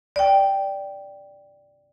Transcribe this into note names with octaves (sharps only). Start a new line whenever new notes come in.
D5 G5